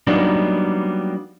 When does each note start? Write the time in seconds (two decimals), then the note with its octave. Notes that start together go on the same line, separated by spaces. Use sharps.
0.07 F#3 G3 A#3 B3 D4 D#4